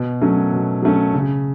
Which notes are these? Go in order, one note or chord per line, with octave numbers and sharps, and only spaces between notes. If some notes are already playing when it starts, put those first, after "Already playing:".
Already playing: B2
F#3 A3 C#4
B2
F#3 A3 C#4
C#3